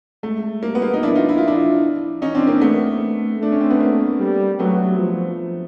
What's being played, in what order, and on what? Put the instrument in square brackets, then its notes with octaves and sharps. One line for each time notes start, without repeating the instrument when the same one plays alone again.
[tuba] G#3 [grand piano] A3
[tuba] G3 [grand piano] A#3
[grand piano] B3
A#3
D#4
[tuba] F3 [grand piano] D4 E4
[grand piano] D#4 F4
E4
F4
D4 E4
[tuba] E3 [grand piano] C#4 D#4
[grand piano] C4 D4
A#3 C4
A3 B3
[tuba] A3
[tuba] A3 [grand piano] D4
[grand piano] C#4
C4
B3
A#3
[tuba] G3
[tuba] F#3 [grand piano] A3 B3
[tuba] F3